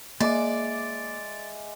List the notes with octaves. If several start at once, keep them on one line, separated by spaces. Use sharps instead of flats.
G#3 A#3 D5 E5 D6